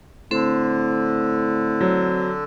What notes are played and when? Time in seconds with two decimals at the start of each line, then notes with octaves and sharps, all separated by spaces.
0.31 A2 D3 C4 A4 C5
1.81 F#3